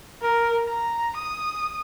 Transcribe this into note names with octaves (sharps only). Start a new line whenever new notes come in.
A#4
A#5
D#6